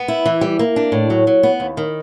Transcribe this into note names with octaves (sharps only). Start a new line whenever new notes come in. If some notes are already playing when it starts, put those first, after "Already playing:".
Already playing: B3
E4
E3
G3
A#3
D4
A2
F#3
F#3
B3
D#2
D#3